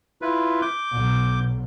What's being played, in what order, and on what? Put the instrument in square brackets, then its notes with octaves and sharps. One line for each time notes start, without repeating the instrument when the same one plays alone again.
[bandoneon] E4 F4 B4
D6 G6
[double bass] B1